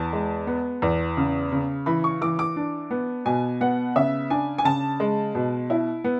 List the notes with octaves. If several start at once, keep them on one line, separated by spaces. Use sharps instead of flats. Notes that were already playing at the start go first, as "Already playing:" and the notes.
Already playing: E2 A5
G#3
B3
E2
C#3
C#3
E3 B5
C#6
E3 D6
D6
D4
B3
B2 G#5
B3 F#5
C#3 E5
D4 G#5
G#5
C#3 A5
G#3
B2
E4
B3